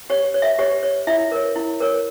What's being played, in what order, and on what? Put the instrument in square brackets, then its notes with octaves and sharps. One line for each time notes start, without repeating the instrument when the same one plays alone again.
[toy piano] G4 C#5
C#5
E5
G4 C#5
C#5
E4 E5
A#4 C#5
E4
A#4 C#5